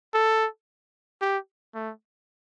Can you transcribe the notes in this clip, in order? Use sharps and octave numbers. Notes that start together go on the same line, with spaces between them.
A4
G4
A3